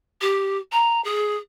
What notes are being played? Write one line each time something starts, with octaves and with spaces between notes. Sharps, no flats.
G4
A#5
G#4